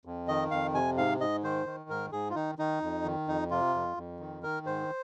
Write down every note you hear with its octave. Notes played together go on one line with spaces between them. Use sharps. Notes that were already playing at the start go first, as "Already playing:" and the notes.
F2
D#3 D#5
F2 F5
C3 G#5
G#2 F5
G#2 D#5
D#3 C5
D#3
G#2 A#4
G#2 G#4
F4
D#3 D#4
D#3 D#4
F2
D#3
F2 D#4
C3 F4
F2
F2
D#3
D#3 A#4
G#2 C5